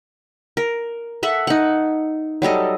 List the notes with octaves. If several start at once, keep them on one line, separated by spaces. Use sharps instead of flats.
A#4
A4 E5 F#5
D#4 F#5
F#3 G3 A4 D#5